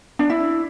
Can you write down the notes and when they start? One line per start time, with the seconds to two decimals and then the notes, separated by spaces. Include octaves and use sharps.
0.19 D4
0.30 E4